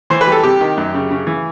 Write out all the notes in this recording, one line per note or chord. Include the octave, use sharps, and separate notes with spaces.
E3 C5
B4
G3
A4
C3 G4
D#3
F#2
C#3
C#3
E3